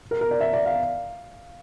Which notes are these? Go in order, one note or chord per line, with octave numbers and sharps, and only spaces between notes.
A#4
A#4
D5
E5
D5
F5